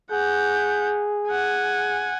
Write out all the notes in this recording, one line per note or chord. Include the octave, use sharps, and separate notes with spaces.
G#4 F#5 G6
F#5 G#5